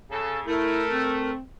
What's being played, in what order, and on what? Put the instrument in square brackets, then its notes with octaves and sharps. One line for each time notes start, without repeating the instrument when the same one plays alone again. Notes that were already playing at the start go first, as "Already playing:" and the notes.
[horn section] C#3 A4
[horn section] A3 [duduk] E4 [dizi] A#4
[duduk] C4